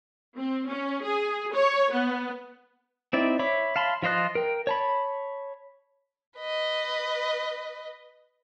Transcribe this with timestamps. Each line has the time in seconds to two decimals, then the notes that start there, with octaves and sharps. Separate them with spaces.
0.37 C4
0.68 C#4
1.03 G#4
1.53 C#5
1.91 B3
3.13 C4 D#4 E4 D5
3.39 C#5 E5 B5 D6
3.76 F5 A5 B5 C6
4.02 F3 F4 C5 D#5 F#6
4.35 A#4 G5
4.67 C#5 A5 B5
6.37 B4 D#5